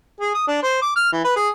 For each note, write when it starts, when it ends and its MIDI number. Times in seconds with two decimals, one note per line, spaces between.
0.21 0.33 68
0.34 0.46 87
0.47 0.60 62
0.63 0.80 72
0.82 0.93 86
0.96 1.08 89
1.12 1.22 52
1.24 1.36 71
1.36 1.49 68